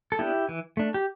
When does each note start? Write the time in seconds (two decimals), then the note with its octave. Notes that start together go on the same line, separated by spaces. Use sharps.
0.12 A4
0.19 B3 D4 E4 G4
0.49 E3
0.77 A3 D4
0.94 G4